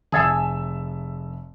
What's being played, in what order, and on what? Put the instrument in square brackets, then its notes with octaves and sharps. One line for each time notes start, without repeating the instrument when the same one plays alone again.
[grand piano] F1 E5 E6 [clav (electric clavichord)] G#4 A4